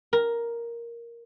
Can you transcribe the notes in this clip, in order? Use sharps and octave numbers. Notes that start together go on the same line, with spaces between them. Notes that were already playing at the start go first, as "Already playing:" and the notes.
A#4